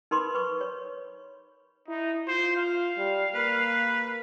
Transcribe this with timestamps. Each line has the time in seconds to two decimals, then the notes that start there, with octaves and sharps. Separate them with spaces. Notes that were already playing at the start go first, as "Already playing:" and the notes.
0.11 D#4 A#4 B4 B5 C6 D6
0.34 B4 B5 C#6
0.61 C#5
1.88 D#4 E4
2.27 F4 C5
2.56 F5
2.97 G3
3.35 A#3 B4